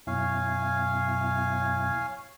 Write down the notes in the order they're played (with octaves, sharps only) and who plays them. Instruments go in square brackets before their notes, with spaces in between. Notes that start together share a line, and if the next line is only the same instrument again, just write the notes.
[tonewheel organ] F#2 B2 E4 [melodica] C#5 F5 G#5